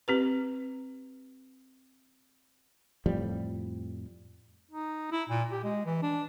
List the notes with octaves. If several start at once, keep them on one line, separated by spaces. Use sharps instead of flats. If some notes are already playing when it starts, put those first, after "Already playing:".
C4 G4 B4
F2 A2 F3 G3
D#4
E4
A#2
G4
G#3
E3
D4